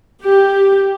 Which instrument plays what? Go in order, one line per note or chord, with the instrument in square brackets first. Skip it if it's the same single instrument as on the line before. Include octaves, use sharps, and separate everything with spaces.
[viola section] G4